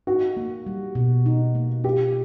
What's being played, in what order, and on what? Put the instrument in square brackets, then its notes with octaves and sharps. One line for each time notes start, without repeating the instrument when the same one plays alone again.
[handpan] D#4 [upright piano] F#4
[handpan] A#3
G3
B2
D#4
A#3
[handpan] F4 [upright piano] G4